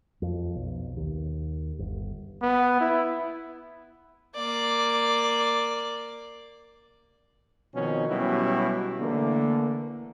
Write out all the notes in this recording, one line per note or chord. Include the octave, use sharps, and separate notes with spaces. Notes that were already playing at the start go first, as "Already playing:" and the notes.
F2
B1
D#2
G1
B3
E4
A#3 D5
B2 D#3 F3 C4 C#4
B2 F#3 G3 C#4 E4 G4
D3 E3 A3 A#3